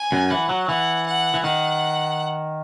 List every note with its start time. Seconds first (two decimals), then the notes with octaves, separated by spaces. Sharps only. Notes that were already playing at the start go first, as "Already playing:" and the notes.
Already playing: G#5
0.12 F#2
0.30 E3 F#5
0.49 F#3
0.68 E3 F#5
1.06 F#5
1.34 E3
1.44 D#3 F#5